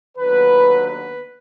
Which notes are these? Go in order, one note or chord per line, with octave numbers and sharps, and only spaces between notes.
D#2 D3 F#3 B3 B4
B4